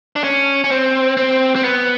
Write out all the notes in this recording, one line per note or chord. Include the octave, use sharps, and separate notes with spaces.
D4
C#4
C#4
C4
C4
C4
B3